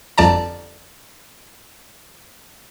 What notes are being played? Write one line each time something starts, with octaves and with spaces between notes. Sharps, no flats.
G1 F2 D5 A5 A#5